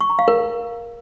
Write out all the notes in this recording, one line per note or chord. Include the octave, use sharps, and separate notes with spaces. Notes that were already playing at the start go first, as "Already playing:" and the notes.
C#6
A#5
F5
A#4